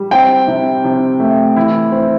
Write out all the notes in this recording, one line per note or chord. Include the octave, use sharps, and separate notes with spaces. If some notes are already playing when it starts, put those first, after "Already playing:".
Already playing: G3
C4 G5
C3
C3
A3
E3 E4
C4